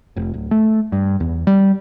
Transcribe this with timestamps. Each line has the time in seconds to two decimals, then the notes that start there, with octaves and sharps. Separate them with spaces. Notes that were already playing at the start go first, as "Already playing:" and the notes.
0.16 F1
0.34 D1
0.51 A3
0.92 G2
1.20 E2
1.47 G3